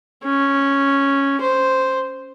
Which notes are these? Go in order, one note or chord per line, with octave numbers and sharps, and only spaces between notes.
C#4
C5